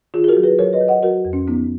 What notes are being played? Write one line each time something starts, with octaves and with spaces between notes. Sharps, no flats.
D#3 F4 G#4
G#4
F#4 A#4
F#3
G#4 B4
F#3 A#4 C#5
B4 D#5
F#3
D#5 F#5
F#3 F#4 A#4
F2
C#4
F3 B3 D#4